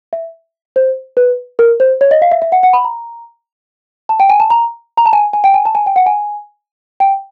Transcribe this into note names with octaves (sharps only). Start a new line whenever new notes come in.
E5
C5
B4
A#4
C5
C#5
D#5
F5
E5
E5
F#5
F#5
B5
A#5
A5
G5
G#5
A5
A#5
A#5
A5
G#5
G#5
G5
G#5
A5
G#5
G5
F#5
G#5
G5